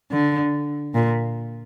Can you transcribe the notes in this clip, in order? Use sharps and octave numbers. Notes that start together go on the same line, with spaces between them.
D3
A#2